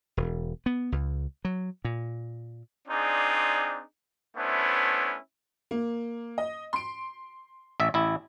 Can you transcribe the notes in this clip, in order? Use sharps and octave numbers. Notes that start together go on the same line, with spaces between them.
E1
B3
C#2
F#3
A#2
C4 D4 D#4 F4 G#4 D5
A3 B3 C#4 D4 E4 C5
A#3
D#5
C6 D7
A1 E5
A1 E4